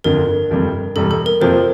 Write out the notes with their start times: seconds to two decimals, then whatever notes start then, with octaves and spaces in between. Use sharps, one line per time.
0.04 G1 F2 D3 A#4
0.50 G1 F2 C3 G3 A#3
0.96 E1 E2 C3 G3 A4
1.11 A4
1.26 A#4
1.41 F2 C3 F3 A#3 C5